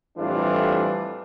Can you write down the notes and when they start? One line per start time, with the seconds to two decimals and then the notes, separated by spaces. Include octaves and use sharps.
0.18 F2 A2 E3 G3 D4 F4